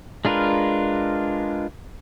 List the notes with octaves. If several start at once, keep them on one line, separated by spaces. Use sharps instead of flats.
G#3 D4 F4 A#4 B4